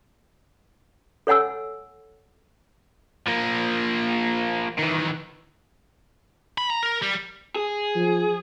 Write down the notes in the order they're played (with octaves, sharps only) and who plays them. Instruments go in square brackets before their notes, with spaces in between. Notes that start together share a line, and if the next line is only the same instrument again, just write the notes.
[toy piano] A4 C#5 F#5 G#5 E6
[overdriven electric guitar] F3 A#3
D#3 E3
[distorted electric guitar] B5
A#5
A#4
G3
[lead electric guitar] G#4
[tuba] F3